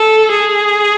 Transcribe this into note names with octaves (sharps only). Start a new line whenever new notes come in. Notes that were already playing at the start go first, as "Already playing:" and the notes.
Already playing: A4
G#4